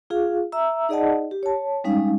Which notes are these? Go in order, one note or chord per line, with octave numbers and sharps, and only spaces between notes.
F4 G#4 F5
E5 A#5 E6
D#4 G#4 D5 D#5 F#5 A5
G4
C#5 A5
G3 G#3 C#4 D#4 F5